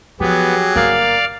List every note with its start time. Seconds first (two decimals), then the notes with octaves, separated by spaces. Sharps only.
0.20 F3 F#3 B3 G4 G#4
0.76 G1 A#3 D5 F5